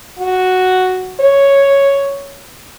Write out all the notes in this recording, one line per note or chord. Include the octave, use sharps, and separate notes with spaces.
F#4
C#5